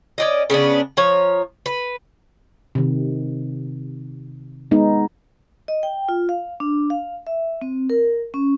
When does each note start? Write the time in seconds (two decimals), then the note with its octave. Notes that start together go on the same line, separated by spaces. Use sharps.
0.18 C#4 D5 D#5
0.50 C#3 B3 C#4 D4
0.97 F3 C#5 A#5
1.66 B4
2.75 C3 D#3
4.71 G#3 B3 D#4
5.68 D#5
5.83 G5
6.09 F4
6.29 F5
6.60 D4
6.90 F5
7.27 E5
7.61 C4
7.90 A#4
8.34 C#4